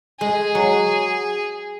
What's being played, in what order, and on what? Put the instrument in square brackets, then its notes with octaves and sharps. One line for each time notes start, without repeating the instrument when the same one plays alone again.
[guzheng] G#3 [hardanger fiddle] G#4
[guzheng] F#3